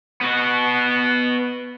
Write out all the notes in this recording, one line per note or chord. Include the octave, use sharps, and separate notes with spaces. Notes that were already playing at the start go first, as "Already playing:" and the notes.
B3 F#4